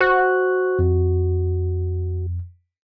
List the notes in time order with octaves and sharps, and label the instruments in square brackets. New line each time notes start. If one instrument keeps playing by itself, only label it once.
[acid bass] F#4 [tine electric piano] C5 C#6 F#6
[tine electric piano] F2